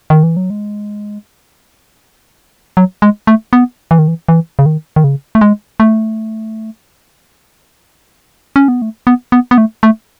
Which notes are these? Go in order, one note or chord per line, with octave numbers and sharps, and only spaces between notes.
D#3
E3
F#3
G#3
F#3
G#3
A3
B3
E3
D#3
E3
E3
C#3
D#3
D#3
C#3
A3
G#3
A3
C#4
B3
A3
B3
B3
B3
A3
A3